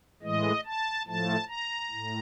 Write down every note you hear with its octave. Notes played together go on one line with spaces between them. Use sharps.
A2 E3 G#3 D#5
A5
A2 F3 A3 A5
A#5
A2